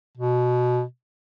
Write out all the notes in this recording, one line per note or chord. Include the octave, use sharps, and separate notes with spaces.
B2